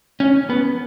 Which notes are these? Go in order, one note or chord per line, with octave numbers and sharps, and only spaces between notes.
C#4
B3